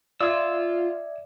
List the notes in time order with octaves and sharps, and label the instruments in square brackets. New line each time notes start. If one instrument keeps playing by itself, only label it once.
[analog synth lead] F4 [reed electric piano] D5 E5 G#6 [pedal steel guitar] E6